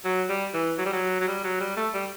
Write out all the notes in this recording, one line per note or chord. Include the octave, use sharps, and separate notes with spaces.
F#3
G3
E3
F#3
G3
F#3
F#3
G3
F#3
G3
A3
G3